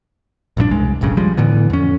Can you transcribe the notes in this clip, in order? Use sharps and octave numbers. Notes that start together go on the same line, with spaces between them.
A#1 G2 D3 D4
E1 C2 G#3
F1 A#1 G2 C#3
F3 G3 G#3
A2 D3 E3 B3
F2 C#4